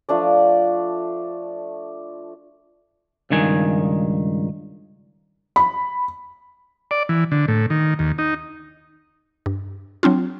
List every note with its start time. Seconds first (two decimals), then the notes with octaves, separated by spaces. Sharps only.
0.09 F3 A3 D4 D5
3.30 C#2 G2 D#3 G#5
5.56 B5
6.91 D5
7.09 E3
7.31 D3
7.48 A2
7.70 D#3
7.99 D#2
8.18 D#4
9.46 G2
10.03 F#3 C4 D4 F4